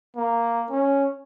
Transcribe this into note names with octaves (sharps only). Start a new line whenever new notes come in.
A#3
C#4